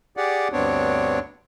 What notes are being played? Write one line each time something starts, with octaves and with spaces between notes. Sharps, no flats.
G4 G#4 D5 F#5
D2 G2 B3 C4 D4 C#5